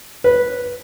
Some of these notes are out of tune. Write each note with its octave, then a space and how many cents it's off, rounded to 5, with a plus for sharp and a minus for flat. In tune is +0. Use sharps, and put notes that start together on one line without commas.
B4 -10